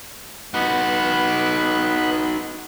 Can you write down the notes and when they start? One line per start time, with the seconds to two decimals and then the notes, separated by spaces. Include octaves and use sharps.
0.54 B3 D#4 F#4 B5 F#6